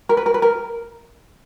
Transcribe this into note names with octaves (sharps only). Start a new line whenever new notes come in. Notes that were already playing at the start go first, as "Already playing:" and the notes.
A#4
B4
A#4
B4
A#4